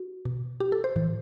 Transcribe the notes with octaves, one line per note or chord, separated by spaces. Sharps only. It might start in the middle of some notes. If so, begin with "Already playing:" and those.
Already playing: F#4
B2
G4
A4
C5
A2 E3